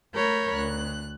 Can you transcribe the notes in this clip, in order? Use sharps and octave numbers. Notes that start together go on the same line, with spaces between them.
A3 A#4 C#5 B5 G6
D2 F#6